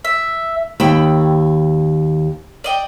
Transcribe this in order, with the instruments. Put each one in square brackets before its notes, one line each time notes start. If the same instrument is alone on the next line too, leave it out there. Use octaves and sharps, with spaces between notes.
[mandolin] E5
[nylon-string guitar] D#2 [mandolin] G5 B5 E6
[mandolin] D5 D#5 G5